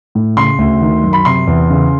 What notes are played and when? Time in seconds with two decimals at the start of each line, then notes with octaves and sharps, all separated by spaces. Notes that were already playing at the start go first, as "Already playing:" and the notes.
0.15 A2
0.37 C#3 C6
0.58 D2
0.81 D#3
1.04 F#2
1.13 B5
1.25 C3 C6
1.47 E2
1.70 C#3